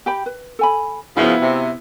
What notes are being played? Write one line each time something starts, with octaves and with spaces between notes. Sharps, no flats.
G4 G5 B5
B4
A4 G#5 B5
C#3 F3 B3 E4 F#4 F5
C3